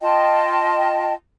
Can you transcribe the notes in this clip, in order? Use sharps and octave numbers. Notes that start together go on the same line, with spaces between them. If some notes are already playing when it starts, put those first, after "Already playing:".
F4 D#5 G5 A5